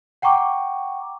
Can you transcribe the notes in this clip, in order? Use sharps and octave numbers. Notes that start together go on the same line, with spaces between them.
F#5 G5 A#5 C#6 D6